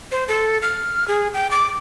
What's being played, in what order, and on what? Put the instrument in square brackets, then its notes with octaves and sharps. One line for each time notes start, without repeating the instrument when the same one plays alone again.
[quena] C5
A4
F6
G#4
G5
D6